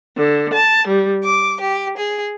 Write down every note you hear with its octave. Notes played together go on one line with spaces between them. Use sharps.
D3
A5
G3
D6
G4
G#4